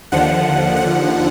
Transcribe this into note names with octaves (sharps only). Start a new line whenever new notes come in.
D#2 D3 F3 F#5
F#5